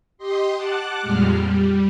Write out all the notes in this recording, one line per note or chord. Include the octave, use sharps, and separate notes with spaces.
G4 D#5 C6
F#5 A5 D6 F#6
F2 A#2 G3 G#3 F6
G3